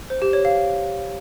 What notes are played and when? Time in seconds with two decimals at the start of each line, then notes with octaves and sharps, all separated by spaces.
0.10 C5
0.22 G4
0.33 C#5
0.45 F5